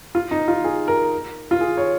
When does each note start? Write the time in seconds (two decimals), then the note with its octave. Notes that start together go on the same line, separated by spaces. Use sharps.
0.15 F4
0.31 D#4
0.48 F4
0.64 G#4
0.88 A#4
1.51 F4
1.61 G#4
1.77 C#5